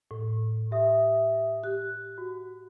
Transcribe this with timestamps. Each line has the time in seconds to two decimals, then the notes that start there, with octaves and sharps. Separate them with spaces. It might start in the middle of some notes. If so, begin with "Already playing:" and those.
0.11 A2
0.71 G4 E5 D#6
1.64 G4 F#6
2.18 F#4